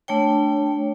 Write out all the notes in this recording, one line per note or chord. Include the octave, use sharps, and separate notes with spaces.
A3 D4 C#5 G5